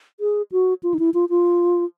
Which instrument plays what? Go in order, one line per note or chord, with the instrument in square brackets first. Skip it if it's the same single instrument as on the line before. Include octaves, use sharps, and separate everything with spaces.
[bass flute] G#4
F#4
F4
D#4
E4
F4
F4